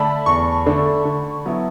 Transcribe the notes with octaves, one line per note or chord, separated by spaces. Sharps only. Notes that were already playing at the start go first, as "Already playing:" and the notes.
Already playing: D3 A3 D4 A4 A5 B5
E2 C#6
D3 A3 D4 A4
D3
F#3 B3 E4